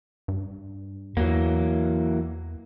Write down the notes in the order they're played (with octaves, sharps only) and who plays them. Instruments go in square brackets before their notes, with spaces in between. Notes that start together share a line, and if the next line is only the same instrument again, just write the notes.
[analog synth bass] G2
[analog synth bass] E2 [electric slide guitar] E3 F#3 A#3